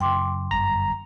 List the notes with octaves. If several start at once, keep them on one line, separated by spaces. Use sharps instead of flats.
F#2 C#3 G5 C6 D6
G1 F#2 G3 A#5